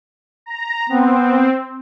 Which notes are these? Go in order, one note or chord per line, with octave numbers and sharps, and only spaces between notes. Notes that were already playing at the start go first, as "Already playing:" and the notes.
A#5
B3 C4